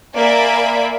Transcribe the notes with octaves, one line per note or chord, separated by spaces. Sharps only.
A#3 D5 E5 G#5 B5 D7